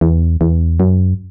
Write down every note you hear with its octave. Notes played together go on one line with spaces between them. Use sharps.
E2
E2
F#2